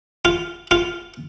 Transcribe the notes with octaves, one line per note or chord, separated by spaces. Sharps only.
F4
F4